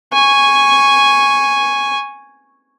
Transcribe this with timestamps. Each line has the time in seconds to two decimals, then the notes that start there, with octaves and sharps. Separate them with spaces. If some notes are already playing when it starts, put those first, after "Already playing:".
0.13 G#5 C#6